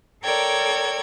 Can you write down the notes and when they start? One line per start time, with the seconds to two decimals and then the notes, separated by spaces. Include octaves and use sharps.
0.24 A4 A#4 C#5 D5 G5 G#6